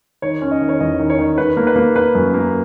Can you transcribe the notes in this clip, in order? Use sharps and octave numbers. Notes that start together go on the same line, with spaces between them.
D#3 C#5
C#4
D#5
D#3
C#5
E2 D#5
D#3
C#5
D#3
D#3 B4
A#3
B4
A#3
A#3 B4
F#2
A#3